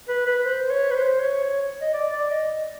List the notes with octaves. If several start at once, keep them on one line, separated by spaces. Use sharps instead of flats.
B4
B4
C5
C#5
B4
C5
C#5
C#5
D#5
D5
D5
D#5